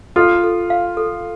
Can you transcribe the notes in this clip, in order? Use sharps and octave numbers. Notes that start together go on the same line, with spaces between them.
F4 A4
A4
F5
A4